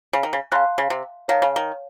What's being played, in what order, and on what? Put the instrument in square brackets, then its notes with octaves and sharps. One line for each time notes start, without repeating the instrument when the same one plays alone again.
[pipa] C#3
D#3
C#3
[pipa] C#3 [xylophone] F5 A5 C6 F#6
[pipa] C#3
C3
[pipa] D#3 [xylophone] C#5 F5 A5
[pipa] C#3
D#3